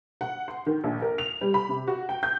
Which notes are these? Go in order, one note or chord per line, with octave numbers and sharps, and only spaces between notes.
F#5
C6
D#3
A#1
A#4
F7
G3
B5
C3
F#4
G5
G6